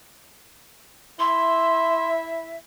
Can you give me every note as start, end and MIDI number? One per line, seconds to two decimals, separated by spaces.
1.19 2.56 64
1.19 2.56 76
1.19 2.08 84